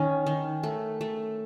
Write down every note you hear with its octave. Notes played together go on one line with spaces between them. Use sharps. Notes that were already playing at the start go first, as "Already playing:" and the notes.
Already playing: D#3 C#4
D#3
A3
A3